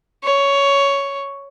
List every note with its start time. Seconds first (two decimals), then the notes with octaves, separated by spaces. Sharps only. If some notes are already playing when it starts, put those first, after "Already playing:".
0.23 C#5